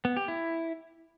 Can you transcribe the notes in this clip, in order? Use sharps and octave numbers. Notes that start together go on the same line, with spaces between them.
B3
G4
E4